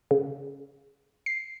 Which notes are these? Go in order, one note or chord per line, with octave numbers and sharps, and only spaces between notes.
C#3
C7